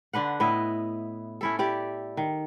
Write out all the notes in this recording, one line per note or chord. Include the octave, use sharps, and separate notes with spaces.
D3 D4 B4 F#5
A2 B3 E4 D#5
C#4 E4 A4
E4 G4 D5
D#3